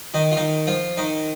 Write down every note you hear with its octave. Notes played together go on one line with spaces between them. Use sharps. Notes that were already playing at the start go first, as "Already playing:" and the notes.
D#3 D#4
F4
D#3 D#4
F3 F4
D#3 D#4